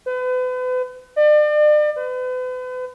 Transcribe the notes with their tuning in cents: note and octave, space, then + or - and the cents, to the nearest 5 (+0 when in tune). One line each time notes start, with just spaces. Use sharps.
B4 +40
D5 +40
B4 +40